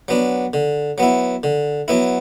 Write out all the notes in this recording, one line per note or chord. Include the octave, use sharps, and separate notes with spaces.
F#3 B3 D4
D3
F#3 B3 E4
D3
F#3 B3 E4